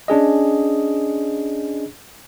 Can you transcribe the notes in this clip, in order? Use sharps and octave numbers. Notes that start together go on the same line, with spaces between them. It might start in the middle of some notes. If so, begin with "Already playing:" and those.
C#4 D4 G#4 D#5